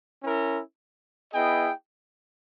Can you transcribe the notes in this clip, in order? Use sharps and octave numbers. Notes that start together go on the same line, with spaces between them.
C#4 E4 A#4
B3 E4 G#4 D#5 G5